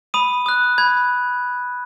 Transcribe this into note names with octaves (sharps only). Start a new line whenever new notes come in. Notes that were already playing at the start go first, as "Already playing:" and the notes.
B5 D#6 D#7
D#6 F#6
B5 G#6